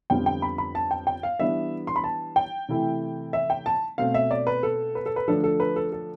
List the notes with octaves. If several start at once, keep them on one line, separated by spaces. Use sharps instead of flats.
F2 D3 G3 B3 F4 G5
G5
B5
B5
A5
G5
G5
F5
E3 G3 B3 D4 E5
C6
B5
A5
G5
C3 E3 A3 E4
E5
G5
A5
B2 A3 C4 F5
E5
D5
B4
A4
B4
A4
B4
D3 F3 A3 D4 A4
A4
B4
A4
A4